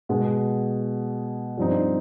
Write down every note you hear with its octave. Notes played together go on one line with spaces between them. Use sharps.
B2 G#3 B3
G2 F3 C4 D#4